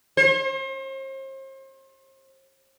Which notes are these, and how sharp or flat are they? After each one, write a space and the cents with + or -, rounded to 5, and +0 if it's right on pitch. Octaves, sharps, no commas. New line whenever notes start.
C5 +40